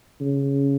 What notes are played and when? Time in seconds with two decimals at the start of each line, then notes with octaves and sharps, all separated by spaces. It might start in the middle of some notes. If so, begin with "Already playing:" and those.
0.21 C#3